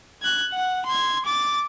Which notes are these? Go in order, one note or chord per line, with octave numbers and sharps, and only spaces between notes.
F#6 G#6
F#5
C6 G#6
D6 A6